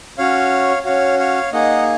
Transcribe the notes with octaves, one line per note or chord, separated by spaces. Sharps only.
C#4 F#4 C#5 F5
C#4 F#4 C#5 F5
C#5 F5
A#3 D#4 G#4 D#5 F#5